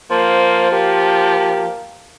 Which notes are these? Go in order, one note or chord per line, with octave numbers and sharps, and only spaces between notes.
F3 A#3 C5
A#3 G4